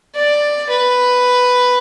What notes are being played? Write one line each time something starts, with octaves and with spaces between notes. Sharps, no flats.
D5
B4